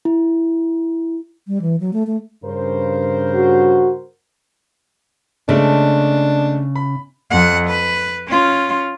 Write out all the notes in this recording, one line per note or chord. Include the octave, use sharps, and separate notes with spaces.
E4
G3
E3
F#3
A3
A3
G2 C#3 A#4 C5
F#4
C#3 G#3 A3 D4
B5
F2 F#5
B4
C#4 F4